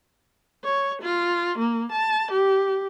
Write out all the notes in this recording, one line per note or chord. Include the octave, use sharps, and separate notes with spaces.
C#5
F4
A#3
A5
G4